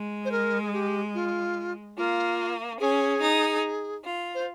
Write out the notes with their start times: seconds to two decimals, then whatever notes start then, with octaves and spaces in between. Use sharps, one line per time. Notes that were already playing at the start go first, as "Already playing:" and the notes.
Already playing: G#3
0.25 C5
0.32 A#4
0.62 G#4
0.73 G4
1.15 F4
1.97 A#3 F4
2.79 C#4 G#4
3.21 D#4
4.04 F4
4.35 C5